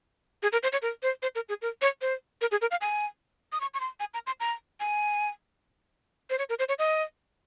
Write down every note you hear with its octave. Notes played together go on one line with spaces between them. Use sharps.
G#4
A#4
C5
C#5
A#4
C5
C5
A#4
G#4
A#4
C#5
C5
A#4
G#4
A#4
F5
G#5
D#6
C#6
C#6
C6
G#5
A#5
C6
A#5
G#5
C5
C#5
A#4
C5
C#5
D#5